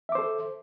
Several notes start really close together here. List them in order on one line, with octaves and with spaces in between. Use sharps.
E5 D6 C5 A4